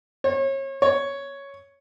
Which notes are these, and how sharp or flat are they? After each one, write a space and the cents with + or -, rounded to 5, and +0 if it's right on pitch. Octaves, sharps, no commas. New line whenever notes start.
C#5 -35
C#5 +5